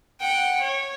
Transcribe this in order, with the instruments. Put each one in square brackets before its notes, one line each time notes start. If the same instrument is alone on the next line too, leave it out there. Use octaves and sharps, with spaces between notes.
[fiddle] F#5 G5
C#5